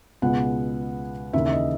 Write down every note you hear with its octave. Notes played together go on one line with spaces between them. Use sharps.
C#2 B2 G#3 B3 F#5
D#2 C#3 E3 E5
E5
D#5